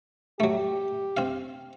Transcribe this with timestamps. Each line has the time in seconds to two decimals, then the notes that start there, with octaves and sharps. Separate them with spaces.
0.40 F#3 A3 G4
1.17 C4 F5